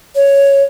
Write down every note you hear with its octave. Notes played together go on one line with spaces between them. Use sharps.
C#5